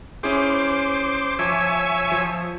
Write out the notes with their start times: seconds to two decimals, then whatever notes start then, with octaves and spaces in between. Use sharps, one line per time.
0.23 C#4 E4 G#4 C5 D6
1.39 F3 C#5 E5 G#5 A5 D6
2.12 F3